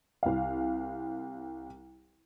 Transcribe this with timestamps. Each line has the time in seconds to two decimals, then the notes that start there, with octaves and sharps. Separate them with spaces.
0.23 C2 F5